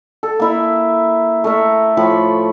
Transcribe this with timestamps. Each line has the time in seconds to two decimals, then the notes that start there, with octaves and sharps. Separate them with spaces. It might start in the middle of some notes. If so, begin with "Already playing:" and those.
0.23 A4
0.40 A#3 E4 E5
1.44 A3 A#4 E5
1.97 A2 F3 B5 C#6